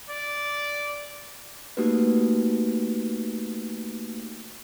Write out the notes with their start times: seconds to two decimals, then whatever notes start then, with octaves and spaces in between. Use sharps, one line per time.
0.10 D5
1.77 A3 A#3 D#4 F#4 G4 B4